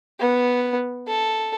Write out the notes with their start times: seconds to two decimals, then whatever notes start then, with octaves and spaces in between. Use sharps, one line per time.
0.20 B3
1.08 A4